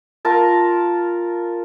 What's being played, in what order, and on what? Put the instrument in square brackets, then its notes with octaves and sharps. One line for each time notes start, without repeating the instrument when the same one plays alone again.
[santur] F4 A#4 A5